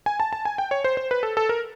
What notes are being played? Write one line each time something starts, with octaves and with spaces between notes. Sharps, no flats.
G#5
A5
A5
G#5
G5
C#5
C5
C5
B4
A4
A4
A#4